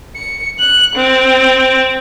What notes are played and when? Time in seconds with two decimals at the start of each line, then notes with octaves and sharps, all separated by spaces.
0.16 C#7
0.59 F#6
0.96 C4